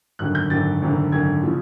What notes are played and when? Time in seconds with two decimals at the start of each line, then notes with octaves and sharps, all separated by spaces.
0.19 G#1 F#2 D3 F#6
0.35 G6
0.50 G#1 F#2 D3 A6
0.82 G#1 F#2 D3
1.12 G#1 F#2 D3 G#6
1.43 C#3 F3